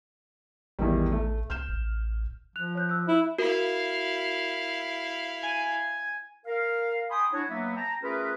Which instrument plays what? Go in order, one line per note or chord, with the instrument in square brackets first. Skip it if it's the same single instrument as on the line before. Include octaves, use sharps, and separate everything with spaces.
[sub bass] A1 [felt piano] E2 D#3 G3
[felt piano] A3
[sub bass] C2 [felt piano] F6 G6 E7
[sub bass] A1
[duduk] F3 [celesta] F#6 F7
[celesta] C#5 F#6 G6
E6 F#6
[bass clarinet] E4
[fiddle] E4 F5 [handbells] F#4 A#4
[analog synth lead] G#5
[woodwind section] A#4 F5
G5 G#5 B5 C6 D#6
D4 E4 F#4 C#5
F#3 A#3 B3 E5
G5 A5 A#5
A3 C#4 F4 G#4 A#4 B4